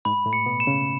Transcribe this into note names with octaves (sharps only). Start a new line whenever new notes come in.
G#2 G#3 B5
A2 A3
C#7
B2 B3
E7
C#3 C#4